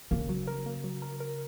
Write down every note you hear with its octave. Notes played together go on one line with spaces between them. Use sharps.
C#3 A#3
F#3
A#4
A#3
F#3
A#4
A#4